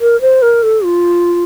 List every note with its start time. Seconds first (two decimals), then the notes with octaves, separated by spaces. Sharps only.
0.01 A#4
0.21 C5
0.42 A#4
0.63 A4
0.84 F4